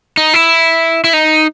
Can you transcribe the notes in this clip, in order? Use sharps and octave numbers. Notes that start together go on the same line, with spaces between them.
D#4
E4
E4
D#4